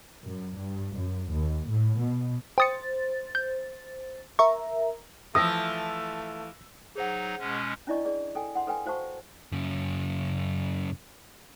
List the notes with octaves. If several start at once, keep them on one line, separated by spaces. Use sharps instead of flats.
F#2
G2
F#2
D#2
A2
B2
C5 G5 D#6 A6 C#7
G6
A#4 E5 A#5 C#6
E3 F3 A3 D#6 E6 A#6
F#3 D#4 G#4 C5 F#5
B2 G#3 C#4
C#4 D4 E4 D5 D#5 C#6
G#4 D5
A4 G5 G#5
F#5 C6
A4 B4 G5 G#5
F#4 C5 F5 A5 C#6
F#2 C#3